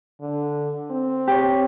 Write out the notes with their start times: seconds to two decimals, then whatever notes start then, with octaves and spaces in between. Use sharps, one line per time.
0.21 D3
0.91 C4
1.27 G4 C#5